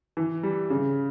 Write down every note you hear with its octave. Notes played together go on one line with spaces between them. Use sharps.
E3
G3
C#3